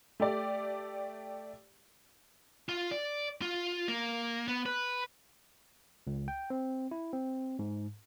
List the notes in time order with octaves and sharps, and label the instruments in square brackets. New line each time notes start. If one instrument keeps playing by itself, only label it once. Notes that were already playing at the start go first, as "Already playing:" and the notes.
[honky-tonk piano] A3 G4 D5
[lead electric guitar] F4
D5
F4
A#3
B3
B4
[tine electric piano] C#2
G5
C4
E4
C4
G#2